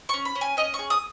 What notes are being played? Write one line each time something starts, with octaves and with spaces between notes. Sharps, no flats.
C#4 C#6
B5
C#4
G#5
C#4 D#5
C#6
G#4
D#6